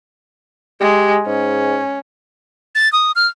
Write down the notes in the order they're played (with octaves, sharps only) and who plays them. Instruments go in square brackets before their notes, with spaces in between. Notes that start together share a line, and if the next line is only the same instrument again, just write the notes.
[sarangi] G#3 [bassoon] G4
[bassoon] G#2 [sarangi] C#4
[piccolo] A6
D#6
F6